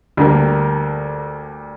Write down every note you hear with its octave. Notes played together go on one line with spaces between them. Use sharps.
D2 D3 G3 A#3